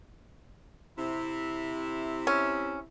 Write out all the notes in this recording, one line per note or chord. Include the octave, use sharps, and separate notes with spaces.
C3 E4
C#4